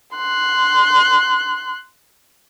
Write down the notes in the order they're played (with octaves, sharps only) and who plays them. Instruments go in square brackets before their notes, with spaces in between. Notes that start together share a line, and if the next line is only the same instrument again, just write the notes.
[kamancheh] C6 F#6